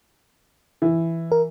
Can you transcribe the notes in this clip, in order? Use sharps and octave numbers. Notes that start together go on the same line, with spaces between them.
E3
A#4